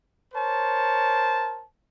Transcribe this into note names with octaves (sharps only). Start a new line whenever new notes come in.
A#4 C5 C#5 A5